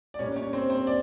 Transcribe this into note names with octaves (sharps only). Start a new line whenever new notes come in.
D5
A#2 G3 A#3 C#4 D4 C#5
C#4 C#5
C4 C5
C4 C5
D5